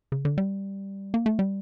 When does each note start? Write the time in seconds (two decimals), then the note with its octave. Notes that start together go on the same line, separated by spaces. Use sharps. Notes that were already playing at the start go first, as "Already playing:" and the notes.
0.12 C#3
0.25 D3
0.38 G3
1.14 A#3
1.26 A3
1.39 G3